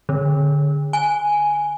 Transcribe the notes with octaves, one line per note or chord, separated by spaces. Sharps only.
D3
G#5